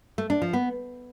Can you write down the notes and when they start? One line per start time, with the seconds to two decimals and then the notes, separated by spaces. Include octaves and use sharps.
0.18 A3
0.30 D4
0.42 F3
0.53 B3